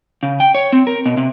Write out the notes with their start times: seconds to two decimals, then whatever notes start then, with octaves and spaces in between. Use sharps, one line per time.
0.23 C#3
0.40 G5
0.55 C#5
0.72 C4
0.87 A#4
1.06 B2
1.17 C3